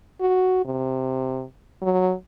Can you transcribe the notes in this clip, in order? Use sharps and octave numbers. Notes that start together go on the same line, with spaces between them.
F#4
C3
F#3